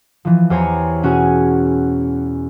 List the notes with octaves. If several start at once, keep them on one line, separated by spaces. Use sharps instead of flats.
E3 F3
E2 G4 C5 C#5 G#5 A#5
B2 C#4 F#4 G#4 G#5